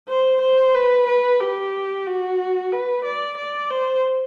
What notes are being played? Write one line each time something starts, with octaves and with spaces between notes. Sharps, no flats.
C5
C5
B4
B4
G4
F#4
B4
D5
D5
C5